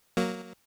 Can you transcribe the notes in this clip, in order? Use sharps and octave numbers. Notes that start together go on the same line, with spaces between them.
F#3 A#3